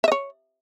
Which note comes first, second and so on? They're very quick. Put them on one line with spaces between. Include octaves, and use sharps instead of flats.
E5 D#5 C#5